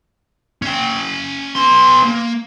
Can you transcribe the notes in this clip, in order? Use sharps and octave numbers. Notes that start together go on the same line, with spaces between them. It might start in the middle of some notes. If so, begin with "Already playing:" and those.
C#4 G5
B3 C6
A#3